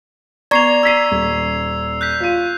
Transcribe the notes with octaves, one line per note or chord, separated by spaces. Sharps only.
B3 D5 A#5 C#6 G#6 C7 F7
E6 G#6 B6 C7 D#7
D#1
F#6 G6 B6
F4 D#7